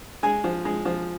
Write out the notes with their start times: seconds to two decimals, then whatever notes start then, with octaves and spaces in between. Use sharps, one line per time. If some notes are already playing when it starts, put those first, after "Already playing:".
0.23 G#3 G#4 G#5
0.44 F3
0.65 G#3
0.85 F3